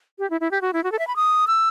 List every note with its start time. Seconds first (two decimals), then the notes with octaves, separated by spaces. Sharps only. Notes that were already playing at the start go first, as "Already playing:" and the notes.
0.19 G4
0.30 E4
0.41 E4
0.51 G4
0.62 F#4
0.73 E4
0.84 F#4
0.92 A4
0.99 E5
1.07 B5
1.16 D#6
1.47 E6